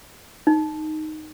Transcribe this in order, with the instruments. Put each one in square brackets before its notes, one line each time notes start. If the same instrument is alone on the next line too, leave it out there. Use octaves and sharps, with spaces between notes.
[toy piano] D#4